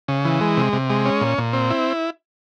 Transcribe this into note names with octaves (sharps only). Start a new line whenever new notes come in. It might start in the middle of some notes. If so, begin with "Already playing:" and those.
C#3
E3
G#3
C3
C3
G#3
C#4
A#2
A#2
C4
E4